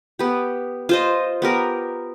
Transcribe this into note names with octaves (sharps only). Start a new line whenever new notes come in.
B3 G4
F4 C5 D#5
B3 G4 A#4